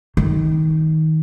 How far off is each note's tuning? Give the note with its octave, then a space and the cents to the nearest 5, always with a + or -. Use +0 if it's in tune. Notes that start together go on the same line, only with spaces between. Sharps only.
D#3 +20